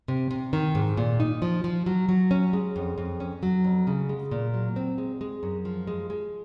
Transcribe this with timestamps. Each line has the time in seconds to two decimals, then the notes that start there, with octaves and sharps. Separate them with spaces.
0.08 C3
0.31 C3
0.53 D#3
0.75 G#2
0.97 A#2
1.20 D#4
1.42 F3
1.64 F3
1.86 F#3
2.09 F#3
2.31 C#4
2.53 G#3
2.76 F2
2.98 F2
3.20 C#4
3.43 F#3
3.64 F2
3.87 C#3
4.09 G#3
4.31 A#2
4.54 F#3
4.76 C4
4.98 G#3
5.21 G#3
5.43 F#2
5.65 F3
5.87 G#3
6.10 G#3